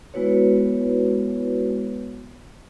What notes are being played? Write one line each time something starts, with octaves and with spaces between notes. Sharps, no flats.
G#3 B3 E4 F#4 B4 C#5